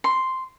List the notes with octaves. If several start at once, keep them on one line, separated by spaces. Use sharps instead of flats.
C6